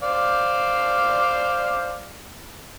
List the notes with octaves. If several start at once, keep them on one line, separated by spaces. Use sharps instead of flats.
C5 D5 F5